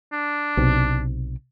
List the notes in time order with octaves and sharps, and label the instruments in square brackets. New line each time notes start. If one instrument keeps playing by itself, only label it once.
[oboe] D4
[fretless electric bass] B1 C3